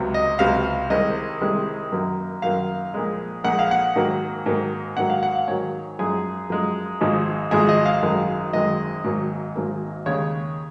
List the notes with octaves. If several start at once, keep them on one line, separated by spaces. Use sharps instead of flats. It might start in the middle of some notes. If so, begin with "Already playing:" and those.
Already playing: C#2 C3 F#3
D#5
C#2 C3 F#3 F5
C2 C3 D#3 G#3 D#5
C2 C3 D#3 G#3
F#2 D#3 F#3 A#3
F#2 D#3 F#3 A#3 F5
A#1 A#2 G#3
A#1 A#2 G#3 F#5
F5
F#5
G#2 D#3 F#3 A#3
G#2 D#3 F#3 A#3
G#2 D#3 F#3 F#5
F5
F#5
F5
G#2 D#3 F#3 C#5
F#2 F3 G#3 G#4
F#2 F3 G#3
G#1 G#2 F3 G#3
G#1 G#2 F3 G#3 G#4
D#5
F5
G#1 F#2 D#3 G#3
G#1 F#2 D#3 G#3 D#5
G#1 G#2 F#3 A#3
G#1 G#2 F#3 A#3
D#2 C#3 G#3 C#5